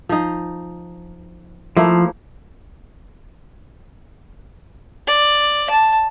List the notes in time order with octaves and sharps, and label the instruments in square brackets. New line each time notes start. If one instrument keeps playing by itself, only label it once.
[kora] F3 D#4
[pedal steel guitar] F3 [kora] A3 A#3 E4
[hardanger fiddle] D5
A5